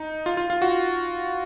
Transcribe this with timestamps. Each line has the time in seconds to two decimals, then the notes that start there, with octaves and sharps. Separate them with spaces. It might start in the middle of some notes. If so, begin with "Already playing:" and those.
Already playing: D#4
0.26 F4
0.37 F4
0.50 F4
0.62 F#4